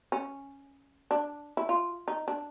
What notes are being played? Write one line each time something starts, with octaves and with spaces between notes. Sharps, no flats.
C#4
D4
E4
F4
D#4
D4